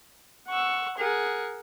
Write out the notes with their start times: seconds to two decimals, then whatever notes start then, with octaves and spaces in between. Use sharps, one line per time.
0.48 F#5 C#6 E6
0.98 G#4 A#4 F#5